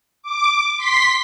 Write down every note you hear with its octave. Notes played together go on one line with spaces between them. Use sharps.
D6
C6 B6